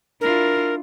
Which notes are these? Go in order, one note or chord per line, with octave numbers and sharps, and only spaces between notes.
D4 E4 F4 A#4